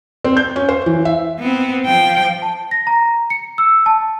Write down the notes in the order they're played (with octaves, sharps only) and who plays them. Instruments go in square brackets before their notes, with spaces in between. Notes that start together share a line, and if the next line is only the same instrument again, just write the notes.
[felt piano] C4
G6
C#4
C5
E3
E5
[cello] B3 C4
F3 G5
[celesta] A5
A#6
A#5
C#7
E6
A5